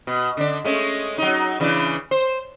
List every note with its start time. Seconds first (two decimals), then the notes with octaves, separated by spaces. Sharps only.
0.07 B2
0.37 D3 D4
0.65 G#3 A3 C#4
1.18 F#3 D#4
1.60 C#3 E3 D4
2.11 C5